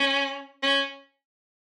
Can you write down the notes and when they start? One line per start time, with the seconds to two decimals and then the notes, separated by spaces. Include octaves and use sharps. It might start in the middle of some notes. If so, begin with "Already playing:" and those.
Already playing: C#4
0.63 C#4